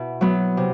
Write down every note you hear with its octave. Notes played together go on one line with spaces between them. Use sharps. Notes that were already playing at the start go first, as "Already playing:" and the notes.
Already playing: B2 E4
F#3 B3
C3